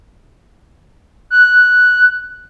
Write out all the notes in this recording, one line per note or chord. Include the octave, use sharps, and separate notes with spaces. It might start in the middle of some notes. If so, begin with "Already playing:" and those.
F#6